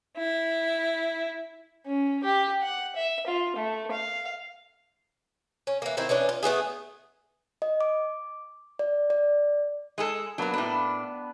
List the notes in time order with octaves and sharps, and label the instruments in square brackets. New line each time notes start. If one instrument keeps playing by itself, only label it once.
[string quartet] E4
[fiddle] C#4
G4
F#5
E5
F4
A3
F5
[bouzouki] C#4
E3 A#3
D#3 A3 C4 E4
E3 B3 C#4 D4
F4
A3 B3 F4 G#4
[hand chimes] D#5
D6
D5
D5
[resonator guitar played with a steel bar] G#3 G#4 A4
[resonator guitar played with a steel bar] F#3 A#4 [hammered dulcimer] A#3 B3 D4
[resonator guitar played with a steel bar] A2 D4 [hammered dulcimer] B3 B4 B5